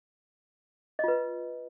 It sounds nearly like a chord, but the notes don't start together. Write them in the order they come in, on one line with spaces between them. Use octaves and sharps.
D#5 F4 B4